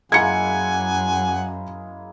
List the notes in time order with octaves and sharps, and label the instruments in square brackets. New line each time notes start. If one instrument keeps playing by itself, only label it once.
[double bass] F#2 [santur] G#3 A#3 E4 [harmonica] F#5 G#5 [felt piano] G#6 C#7